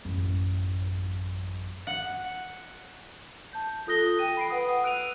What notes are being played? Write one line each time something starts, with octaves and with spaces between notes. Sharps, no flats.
A1 F#2
F#5
A5 G6
F4 A4 D#6 F#6 A#6 G7
G5 D#7
B5 C7 D7
B4 F#5 D#6
E6 F#6 D7 D#7 F7